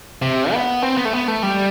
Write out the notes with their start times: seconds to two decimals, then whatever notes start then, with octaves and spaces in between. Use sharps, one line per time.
0.22 C3
0.53 B3
0.82 C4
0.97 B3
1.05 A3
1.13 B3
1.28 A3
1.43 G3